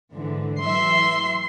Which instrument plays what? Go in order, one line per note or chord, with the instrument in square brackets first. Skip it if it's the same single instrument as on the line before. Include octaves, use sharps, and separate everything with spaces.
[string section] G#2 D3 E3
[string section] E3 F#3 E5 [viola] C6